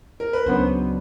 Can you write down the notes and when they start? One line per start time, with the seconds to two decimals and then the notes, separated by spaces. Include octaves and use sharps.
0.20 A#4
0.33 B4
0.46 C#2 C#3 F#3 B3 D4 C5